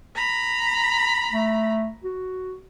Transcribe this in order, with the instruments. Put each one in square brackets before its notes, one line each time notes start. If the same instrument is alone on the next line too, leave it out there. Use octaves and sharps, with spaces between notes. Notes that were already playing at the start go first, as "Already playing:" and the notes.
[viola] A#5 B5
[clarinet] A3
F#4